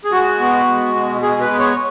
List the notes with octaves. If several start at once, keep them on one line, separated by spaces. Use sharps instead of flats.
G#4
G#3 F#4
B3
G#3
B2
G#3 G#4
B4
B3
C#5